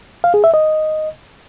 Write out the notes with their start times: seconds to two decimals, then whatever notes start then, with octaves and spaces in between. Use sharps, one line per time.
0.24 F5
0.34 G#4
0.44 E5
0.54 D#5